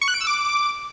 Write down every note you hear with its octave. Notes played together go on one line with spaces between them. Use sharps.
C#6
F#6
D7
E6
D6